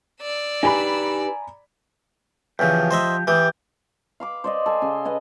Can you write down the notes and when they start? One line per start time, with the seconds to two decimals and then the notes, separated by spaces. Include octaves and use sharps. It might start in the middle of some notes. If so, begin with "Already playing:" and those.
0.21 D5 E6
0.63 D#4 G4 B4 G#5 A#5 B5
2.59 E2 C#3 F3 G4
2.91 C5 D#5 E5
3.27 E3 G4 D#6
4.20 F5 B5 D6
4.44 C5 D5 D#5
4.66 A4 G#5
4.82 C#3 C6
5.05 B4 D#5 G#5